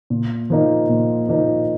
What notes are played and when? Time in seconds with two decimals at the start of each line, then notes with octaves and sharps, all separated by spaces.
0.10 A#2
0.50 F3 A#3 D#4
0.89 A#2
1.29 F3 A#3 D#4